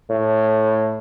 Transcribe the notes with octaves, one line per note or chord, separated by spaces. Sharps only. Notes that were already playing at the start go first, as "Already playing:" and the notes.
A2